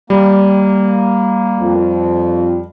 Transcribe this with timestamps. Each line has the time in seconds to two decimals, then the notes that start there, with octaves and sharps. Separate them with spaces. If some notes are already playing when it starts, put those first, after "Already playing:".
0.10 G3 A#3
1.58 F2